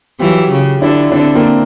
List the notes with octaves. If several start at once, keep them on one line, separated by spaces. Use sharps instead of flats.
E3 F#3 F4 G4
C#3
D3 D4 E4
D3 C4 D4
A#3 C4